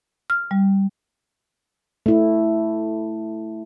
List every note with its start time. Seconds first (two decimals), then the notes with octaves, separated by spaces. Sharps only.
0.30 F6
0.51 G3
2.06 A3 E4